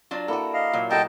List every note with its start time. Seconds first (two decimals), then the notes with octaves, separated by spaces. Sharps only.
0.11 F#3 D4 F4
0.28 A#3 E4 F#4 A4 D5
0.54 D#5 F5
0.73 A#2 F#3
0.91 A2 F#3 F#4 A4 D#5 G5 A5